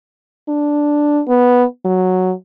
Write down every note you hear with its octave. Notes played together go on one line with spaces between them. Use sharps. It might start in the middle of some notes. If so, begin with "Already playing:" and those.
D4
B3
F#3